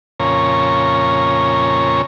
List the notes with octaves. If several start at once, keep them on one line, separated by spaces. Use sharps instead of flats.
F2 A#2 C#3 C#5 A#5